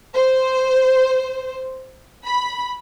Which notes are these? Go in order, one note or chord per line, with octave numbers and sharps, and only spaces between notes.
C5
B5